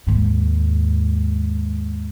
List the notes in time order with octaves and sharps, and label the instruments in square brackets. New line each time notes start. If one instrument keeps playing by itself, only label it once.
[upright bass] D#2 G#2